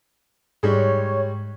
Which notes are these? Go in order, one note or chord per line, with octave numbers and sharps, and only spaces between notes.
G#2 G3 G#3 C#5